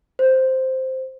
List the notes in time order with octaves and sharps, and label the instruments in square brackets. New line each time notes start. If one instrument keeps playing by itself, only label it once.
[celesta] C5